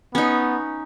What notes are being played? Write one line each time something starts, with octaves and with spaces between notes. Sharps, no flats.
B3 C#4 D#4